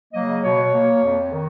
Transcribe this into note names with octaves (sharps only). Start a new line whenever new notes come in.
C#3 F#3 A#3 D#5
B2 C#5
A#3
F2
D#3